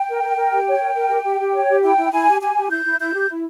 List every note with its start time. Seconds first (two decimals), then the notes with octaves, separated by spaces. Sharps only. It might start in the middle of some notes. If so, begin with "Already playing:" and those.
Already playing: G5
0.09 A#4
0.23 A#4
0.37 A#4
0.53 G4
0.67 C#5
0.81 A#4
0.95 A#4
1.10 G4
1.25 G4
1.39 G4
1.54 C#5
1.69 G4
1.83 E4 G5
1.97 E4
2.12 E4 G#5
2.27 G4
2.41 G4 G#5
2.55 G4
2.70 E4 G6
2.85 E4
3.00 E4 G6
3.14 G4
3.29 E4